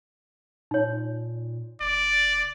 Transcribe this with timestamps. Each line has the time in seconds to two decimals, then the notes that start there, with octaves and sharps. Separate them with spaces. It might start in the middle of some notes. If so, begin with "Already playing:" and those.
0.71 A#2 D#4 C#5
1.81 F#1 D5